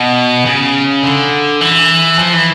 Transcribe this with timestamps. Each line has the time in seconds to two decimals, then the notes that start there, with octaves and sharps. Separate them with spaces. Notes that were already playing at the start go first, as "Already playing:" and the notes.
Already playing: B2
0.45 C#3
1.03 D3
1.61 E3
2.19 F3
2.33 E3